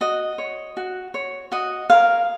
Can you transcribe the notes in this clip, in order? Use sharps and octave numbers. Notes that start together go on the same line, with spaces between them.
F#4 D#5
C#5
F#4
C#5
F#4 D#5
A#4 C#5 F5